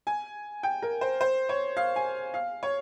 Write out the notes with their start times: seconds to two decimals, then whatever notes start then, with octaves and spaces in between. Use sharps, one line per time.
0.07 G#5
0.63 G5
0.82 A#4
1.01 C5
1.21 C5
1.49 C#5
1.77 F5
1.96 G#5
2.34 F5
2.63 C#5